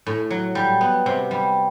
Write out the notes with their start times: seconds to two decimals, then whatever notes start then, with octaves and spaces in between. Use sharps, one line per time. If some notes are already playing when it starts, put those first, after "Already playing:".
0.06 A2
0.30 F#3
0.55 G3
0.81 B3
1.06 C3
1.31 G3